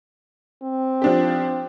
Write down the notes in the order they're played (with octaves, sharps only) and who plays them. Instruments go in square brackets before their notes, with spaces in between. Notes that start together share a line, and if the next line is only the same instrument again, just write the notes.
[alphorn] C4
[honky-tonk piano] F3 D4 G4